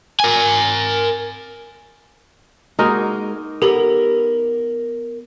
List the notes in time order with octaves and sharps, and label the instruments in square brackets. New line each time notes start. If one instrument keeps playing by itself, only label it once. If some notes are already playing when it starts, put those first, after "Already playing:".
[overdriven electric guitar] A#4 G#5
[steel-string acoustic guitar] G#3 A#3 [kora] D#4 F#4 A#4
[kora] B3 [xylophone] G4 A4 [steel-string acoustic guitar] A#4